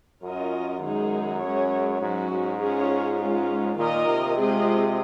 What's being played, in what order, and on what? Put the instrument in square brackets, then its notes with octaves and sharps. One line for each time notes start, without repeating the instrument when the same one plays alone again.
[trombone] F#2 [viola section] C#4 F4 A#4 D#5
[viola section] D#3 G#3 D#4 G#4
G#3 C#4 G#4 C#5
[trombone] G#2 [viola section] F#3 C#4 F#4
[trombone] G#2
[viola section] C#4 F4 G#4 C#5
G#3 C#4 F4
[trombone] A#2 [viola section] D#3 A#3 F4 A#4 D#5
[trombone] C3
[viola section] G#3 C4 F4 G#4 D#5